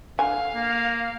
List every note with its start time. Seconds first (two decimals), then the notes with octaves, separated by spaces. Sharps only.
0.19 D3 F5 G#5
0.55 A#3